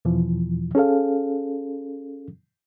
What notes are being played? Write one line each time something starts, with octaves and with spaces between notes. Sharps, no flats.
E2 B2 E3 F3
C#4 G#4 A4 F5